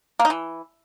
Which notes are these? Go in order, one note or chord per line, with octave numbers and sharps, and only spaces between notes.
A#3
D#4
E3